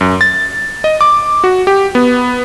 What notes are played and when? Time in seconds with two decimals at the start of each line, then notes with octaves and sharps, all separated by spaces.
0.01 F#2
0.21 A6
0.84 D#5
1.01 D6
1.44 F#4
1.67 G4
1.95 B3